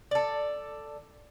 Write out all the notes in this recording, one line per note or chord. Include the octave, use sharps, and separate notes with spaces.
A4 D5